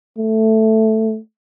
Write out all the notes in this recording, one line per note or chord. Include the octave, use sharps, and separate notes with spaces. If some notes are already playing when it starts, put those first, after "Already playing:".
A3